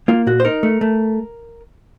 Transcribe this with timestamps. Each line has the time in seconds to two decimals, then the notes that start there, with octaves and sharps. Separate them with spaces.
0.08 A#3 F4
0.27 A#2 F#4
0.40 C5
0.45 D#4 A#4
0.63 A3
0.81 A3